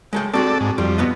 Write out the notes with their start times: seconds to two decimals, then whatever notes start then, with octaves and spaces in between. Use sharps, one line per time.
0.13 G#3 A4 G5
0.34 C4 F#4 G#4 A4 D5
0.60 G#2
0.78 F2 G3
0.98 B3 B4 D#5